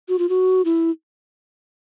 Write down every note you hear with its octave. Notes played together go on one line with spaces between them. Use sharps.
F#4
F4
F#4
E4